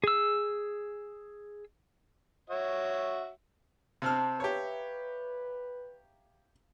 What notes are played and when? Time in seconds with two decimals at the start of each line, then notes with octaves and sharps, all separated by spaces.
0.04 G#4 E6
2.50 F#4 C#5 E5
4.02 C3 C4 A5 B5 D6 F6
4.40 G4 B4 C#5 E5 F5 A#5